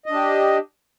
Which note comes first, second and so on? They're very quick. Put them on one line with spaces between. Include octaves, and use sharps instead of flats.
D#5 D4 G4